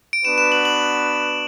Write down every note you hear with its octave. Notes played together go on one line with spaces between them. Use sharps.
D7
B3 D4 F#4 B4 E7
E7
F#7
F#7